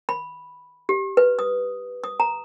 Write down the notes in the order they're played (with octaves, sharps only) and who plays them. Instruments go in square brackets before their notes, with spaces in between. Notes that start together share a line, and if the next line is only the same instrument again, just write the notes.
[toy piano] B5
G4
B4
D#6
D#6
A#5